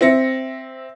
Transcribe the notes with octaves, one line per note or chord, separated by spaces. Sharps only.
C4 E5 A#6 C#7